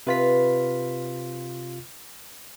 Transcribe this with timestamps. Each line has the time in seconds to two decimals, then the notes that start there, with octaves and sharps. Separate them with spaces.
0.07 C3 F4 B4 B6